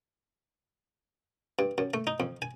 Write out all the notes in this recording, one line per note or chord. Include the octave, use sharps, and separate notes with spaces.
G2
F#2
A3
D#4
F2
G#5